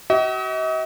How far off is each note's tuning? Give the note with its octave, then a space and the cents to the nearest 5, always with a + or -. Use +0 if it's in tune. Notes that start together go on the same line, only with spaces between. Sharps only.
F#4 +40 D#5 +45